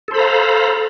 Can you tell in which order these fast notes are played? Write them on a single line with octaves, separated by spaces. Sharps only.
A4 C5 B5 A#5 F5